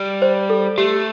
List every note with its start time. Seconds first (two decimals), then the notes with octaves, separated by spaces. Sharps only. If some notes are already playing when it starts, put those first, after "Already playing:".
Already playing: G3
0.22 C5
0.50 A4
0.78 A3 G4